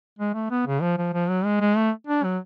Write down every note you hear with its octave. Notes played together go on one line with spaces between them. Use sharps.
G#3
A3
B3
C#3
F3
F3
F3
F#3
G#3
G#3
A3
D4
F#3